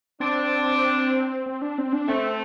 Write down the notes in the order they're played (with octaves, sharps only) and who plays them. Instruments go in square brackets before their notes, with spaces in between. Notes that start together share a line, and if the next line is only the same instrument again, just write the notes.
[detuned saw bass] C4 [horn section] D4
[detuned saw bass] C4
D4
C4
D4
[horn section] A3 [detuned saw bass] C4